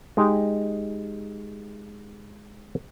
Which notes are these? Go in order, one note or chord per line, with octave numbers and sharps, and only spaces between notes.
G#3 D#4 G4